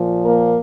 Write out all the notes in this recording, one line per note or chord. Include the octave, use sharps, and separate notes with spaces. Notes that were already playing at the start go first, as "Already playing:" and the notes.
Already playing: A#2 F3
A#3 A#4